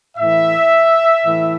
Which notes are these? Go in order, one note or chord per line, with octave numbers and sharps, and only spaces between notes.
A2 E3 E5
A2 E3